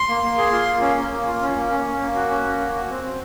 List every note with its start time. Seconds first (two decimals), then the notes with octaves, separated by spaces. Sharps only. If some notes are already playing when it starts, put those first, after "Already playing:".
Already playing: C6
0.09 A#3
0.23 A#3
0.37 G#4
0.52 F4
0.67 A#3
0.81 C#4
0.97 A#3
1.11 A#3
1.26 F4
1.42 C#4
1.56 A#3
1.71 C#4
1.86 A#3
2.01 A#3
2.15 F#4
2.30 C#4
2.44 A#3
2.60 F#4
2.75 F#4
2.90 C4
3.04 C4